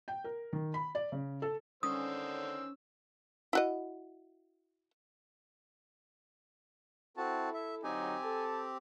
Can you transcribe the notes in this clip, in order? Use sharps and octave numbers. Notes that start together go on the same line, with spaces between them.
G5
A#4
D#3
B5
D5
C#3
A4
D3 D#3 C#4 C5 D#6 E6
E4 F#4 D#5
C4 E4 F#4 A4 A5
E5
D3 F#3 C4 D#4 G4 G#5
A4 A5